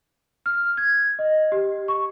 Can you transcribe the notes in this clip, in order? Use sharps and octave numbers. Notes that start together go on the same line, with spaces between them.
F6
G#6
D#5
G4
C#6